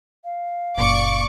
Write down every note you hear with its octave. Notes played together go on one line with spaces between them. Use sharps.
F5
F#1 A#2 D5 C#6 D6